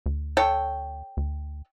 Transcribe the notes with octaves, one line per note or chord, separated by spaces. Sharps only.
D2
A4 C#5 G5
D2